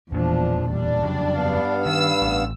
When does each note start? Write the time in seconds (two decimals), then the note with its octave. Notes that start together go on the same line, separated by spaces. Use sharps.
0.12 E1 E2 A#2 F3 D4
0.69 G3 D4
1.02 F2 C#3 F#3
1.34 G2 B3 F5
1.86 D#3 E6
2.22 A1